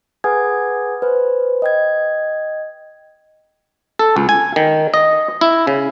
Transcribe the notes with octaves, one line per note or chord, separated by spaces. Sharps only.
G#4 B4 F#5 G#5 D#6 G#6
B4 C5
D#5 G5 G#6
A4
C#2
G#5
D#3
D#5
E4
C#3